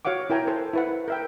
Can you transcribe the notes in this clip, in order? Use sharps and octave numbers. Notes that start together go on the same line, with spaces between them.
F#4 C#5 F5 F#5 D6
E4 A#4 G5 G#5 A#5
A4 C5
E4 B4 F#5
A#4 E5 G5